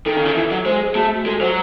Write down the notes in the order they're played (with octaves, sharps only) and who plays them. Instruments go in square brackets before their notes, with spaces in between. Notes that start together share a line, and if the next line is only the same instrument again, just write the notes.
[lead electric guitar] D#3 [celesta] A4
[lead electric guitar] C#3
D#3
E3
F#3
[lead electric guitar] G#3 [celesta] C5
[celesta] G#4
[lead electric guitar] A3 [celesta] F#4
[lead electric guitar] G#3 [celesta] A4
[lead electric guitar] F#3 [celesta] C5